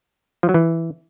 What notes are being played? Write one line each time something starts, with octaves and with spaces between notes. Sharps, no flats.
F3
F#3
E3